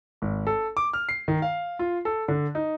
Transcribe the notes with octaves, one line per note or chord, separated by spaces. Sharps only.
G#1
A4
D6
F6
C7
D#3
F5
F4
A4
D3
D#4